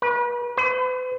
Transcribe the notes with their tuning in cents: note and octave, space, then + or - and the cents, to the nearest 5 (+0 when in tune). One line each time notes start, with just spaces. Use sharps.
B4 -35
B4 +45